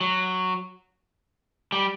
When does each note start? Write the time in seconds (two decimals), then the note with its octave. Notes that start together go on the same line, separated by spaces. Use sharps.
0.01 F#3
1.72 G3